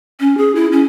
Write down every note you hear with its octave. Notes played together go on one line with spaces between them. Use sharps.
C#4
G#4
E4
C#4